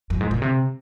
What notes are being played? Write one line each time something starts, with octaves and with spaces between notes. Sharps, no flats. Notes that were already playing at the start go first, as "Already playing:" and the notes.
F#2
G#2
A#2
C3